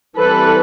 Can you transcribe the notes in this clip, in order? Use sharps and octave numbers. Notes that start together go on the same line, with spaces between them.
E3 G3 C4 A4 B4